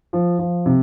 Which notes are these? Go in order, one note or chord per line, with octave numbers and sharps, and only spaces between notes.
F3
F3
C3